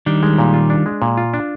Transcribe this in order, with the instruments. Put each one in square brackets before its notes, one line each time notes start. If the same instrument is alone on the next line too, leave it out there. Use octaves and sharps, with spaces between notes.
[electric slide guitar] D#3 G3 [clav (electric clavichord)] D4
[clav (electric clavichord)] G#3
A#2
F4
D4
G#3
A#2
F4
D4